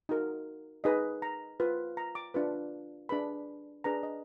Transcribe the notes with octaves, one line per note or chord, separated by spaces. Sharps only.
D#4 F#4 A#4
D#4 G#4 B4 D#5
A#5
F4 B4
A#5
D6
D4 F4 B4
D4 G#4 B4 B5
D4 G#4 B4 A#5
D#5